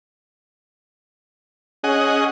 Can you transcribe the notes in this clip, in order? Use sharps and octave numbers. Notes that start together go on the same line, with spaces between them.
C#4 G#4 D#5 F#5